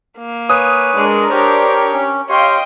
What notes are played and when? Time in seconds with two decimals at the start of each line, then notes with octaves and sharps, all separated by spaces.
0.18 A#3
0.50 B4 C#5 G#5 D#6
0.96 G#3 D4 A#4
1.30 G4 C5 C#5
1.93 C#4
2.30 G4 C#5 D#5 F5 G5 C6